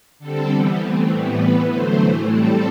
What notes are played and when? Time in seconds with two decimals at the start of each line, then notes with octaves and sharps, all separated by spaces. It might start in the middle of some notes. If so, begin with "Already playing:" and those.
0.19 D3 G3 C4 A4
0.50 E3 G3 B3
0.79 E3 A3 C4
1.09 A2 E3 G3 B3
1.38 E3 B3 B4
1.69 D3 F#3 A3 C5
1.99 A2 E3 A3
2.28 A2 G3 C4 A4